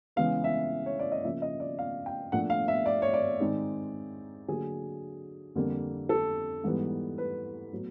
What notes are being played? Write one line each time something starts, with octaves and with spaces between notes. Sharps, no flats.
C#3 E3 G#3 B3 F5
E5
C#5
D5
D#5
C#3 F3 A#3 E5
D#5
D5
F5
G5
A#2 F3 A3 D4 F#5
F5
E5
D5
C#5
D5
G#2 D#3 G#3 C4 D#4
D3 F#3 A#3 G#4
F2 D3 G3 A#3
A4
G#2 E3 G3 B3
B4
A2 F#3 B3